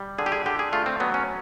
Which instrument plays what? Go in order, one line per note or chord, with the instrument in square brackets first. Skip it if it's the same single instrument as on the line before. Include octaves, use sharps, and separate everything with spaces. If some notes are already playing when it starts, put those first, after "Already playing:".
Already playing: [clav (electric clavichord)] G3
D3 G#4
G4
G#4
D3 G4
G#4
A3 F4
C4
F#3 B3
C#4